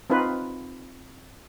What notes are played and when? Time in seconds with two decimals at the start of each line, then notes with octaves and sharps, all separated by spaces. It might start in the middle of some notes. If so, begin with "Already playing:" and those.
0.10 C4 D#4 F4 B4